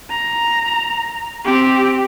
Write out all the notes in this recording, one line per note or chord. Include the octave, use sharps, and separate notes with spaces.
A#5
C4 G4